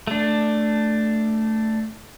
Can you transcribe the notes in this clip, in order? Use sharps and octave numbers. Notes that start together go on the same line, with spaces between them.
A3 D4